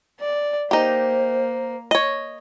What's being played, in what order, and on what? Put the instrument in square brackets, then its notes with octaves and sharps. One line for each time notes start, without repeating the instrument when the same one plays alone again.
[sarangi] D5
[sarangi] A#3 [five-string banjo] D#4 G4 [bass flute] C5
[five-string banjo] C#5 D#5